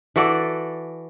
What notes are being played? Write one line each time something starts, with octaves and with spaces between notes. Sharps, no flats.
E3 F#4 A4 D5